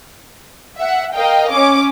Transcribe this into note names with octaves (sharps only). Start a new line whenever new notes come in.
E5 F#5
A#4 D#5 F5 G5
C#4 D6